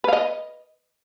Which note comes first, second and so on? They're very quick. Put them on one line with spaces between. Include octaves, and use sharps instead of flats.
B4 F5 D#5